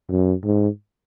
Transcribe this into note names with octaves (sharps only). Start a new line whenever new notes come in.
F#2
G#2